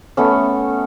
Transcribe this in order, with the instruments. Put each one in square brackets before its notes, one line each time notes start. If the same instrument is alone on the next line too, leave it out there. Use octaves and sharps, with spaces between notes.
[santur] A3 B3 C#4